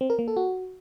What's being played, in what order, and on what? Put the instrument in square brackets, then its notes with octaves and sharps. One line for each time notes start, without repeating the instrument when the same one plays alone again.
[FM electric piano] C4
A#4
A#3
A4
F#4